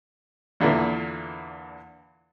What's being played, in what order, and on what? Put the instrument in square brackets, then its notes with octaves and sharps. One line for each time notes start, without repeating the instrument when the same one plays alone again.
[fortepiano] E2 A#2 D3 E3